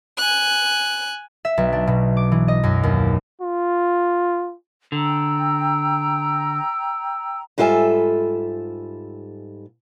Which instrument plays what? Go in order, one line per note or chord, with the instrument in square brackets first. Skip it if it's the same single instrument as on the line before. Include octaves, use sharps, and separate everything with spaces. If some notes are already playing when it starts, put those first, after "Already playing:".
[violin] G#5 F#6
[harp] E5
B1
D4
B2
D6
E3
D#5
F#2
D#2
[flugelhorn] F4
[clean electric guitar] D3 [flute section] G5 A#5 E6
[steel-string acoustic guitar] G#2 G3 F4 A4 E5 G#5